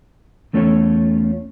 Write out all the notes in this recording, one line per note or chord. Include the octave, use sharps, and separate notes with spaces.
E2 A3 C#4 F4 A4 C#5